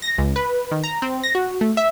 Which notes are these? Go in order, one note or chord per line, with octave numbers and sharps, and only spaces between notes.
A#6
C#2
B4
D#3
A#5
C4
A#6
F#4
A3
E5